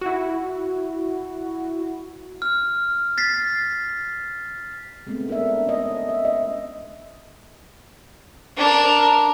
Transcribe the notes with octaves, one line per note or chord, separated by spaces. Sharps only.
E4 F#4
F6
A6 B6 C7
G#3 A3 B3 C4
D4 A#4 E5
C#4 D#5
E5
D#5
D4 A#4